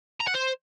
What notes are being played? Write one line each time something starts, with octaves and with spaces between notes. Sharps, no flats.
A#5
F#5
C5